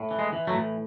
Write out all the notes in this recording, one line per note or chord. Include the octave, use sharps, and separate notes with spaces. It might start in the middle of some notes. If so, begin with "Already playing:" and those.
Already playing: A2
E3
G#3
E3
F#3 A3
A2